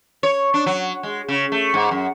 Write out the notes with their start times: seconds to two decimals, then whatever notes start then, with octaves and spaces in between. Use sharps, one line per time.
0.23 C#5
0.54 D4
0.66 F#3
1.03 G#3
1.28 C#3
1.52 A3
1.74 G#2
1.91 F#2